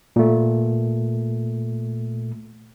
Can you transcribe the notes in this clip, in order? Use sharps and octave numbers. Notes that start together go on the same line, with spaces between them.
A#2 A3